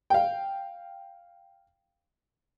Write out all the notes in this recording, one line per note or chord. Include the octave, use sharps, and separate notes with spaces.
F5 G5